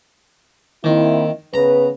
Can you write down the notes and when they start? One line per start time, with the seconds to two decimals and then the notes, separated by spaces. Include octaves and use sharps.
0.84 D#3 A#3 C4 E4
1.54 C#3 B3 B4 A#5